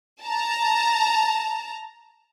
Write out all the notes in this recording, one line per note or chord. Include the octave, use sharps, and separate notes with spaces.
A5 A#5